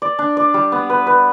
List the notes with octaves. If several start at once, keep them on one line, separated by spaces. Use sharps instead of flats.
D5
D4
D5
G3
B3
B4
B4